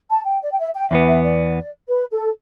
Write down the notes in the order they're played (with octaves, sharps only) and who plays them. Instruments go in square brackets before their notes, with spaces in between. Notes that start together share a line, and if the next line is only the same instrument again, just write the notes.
[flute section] A5
G5
D5
G5
E5
G5
[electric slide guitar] E2 E3 B3 [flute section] E5
[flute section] E5
D5
B4
A4